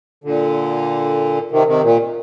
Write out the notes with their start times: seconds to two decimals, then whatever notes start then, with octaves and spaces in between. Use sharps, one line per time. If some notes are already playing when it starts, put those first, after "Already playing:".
0.24 A#2 D3
1.51 C3 D#3
1.67 C3 D#3
1.83 A#2